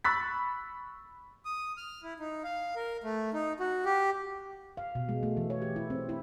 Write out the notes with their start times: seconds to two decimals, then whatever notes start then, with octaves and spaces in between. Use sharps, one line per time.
0.04 B5 C#6 E6 F#6 A6 B6
1.45 D#6
1.77 F6
2.03 E4
2.19 D#4
2.44 F5
2.76 A#4
3.04 A3
3.34 D#4
3.60 F#4
3.85 G4
4.77 F5
4.95 B2
5.09 G#3
5.23 A3
5.37 E3
5.50 C#5
5.62 G4
5.76 E4
5.90 C4
6.09 E4